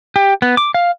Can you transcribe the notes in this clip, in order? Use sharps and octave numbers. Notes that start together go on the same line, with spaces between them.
G4
B3
D6
F5